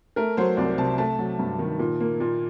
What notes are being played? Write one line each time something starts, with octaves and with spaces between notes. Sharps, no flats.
A3 A#4
F#3 C5
C2 D5
C3 A5
A3 A5
F#3
G2
D#3
A#2
A#3
A#2